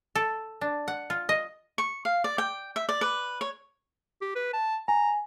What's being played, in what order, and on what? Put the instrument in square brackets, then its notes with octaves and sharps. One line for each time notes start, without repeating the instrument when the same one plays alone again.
[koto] A4
D4
F#5
F4
D#5
[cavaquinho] C#6
F5
D5
G5
E5
D5
B4
C#5
[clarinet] G4
B4
A5
[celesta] G#5 [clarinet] A#5